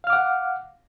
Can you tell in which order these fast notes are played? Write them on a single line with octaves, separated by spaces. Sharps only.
F5 F6 D6 F#5